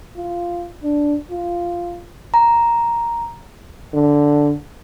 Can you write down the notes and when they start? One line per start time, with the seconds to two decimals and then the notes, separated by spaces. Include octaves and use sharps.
0.17 F4
0.84 D4
1.31 F4
2.34 A#5
3.93 D3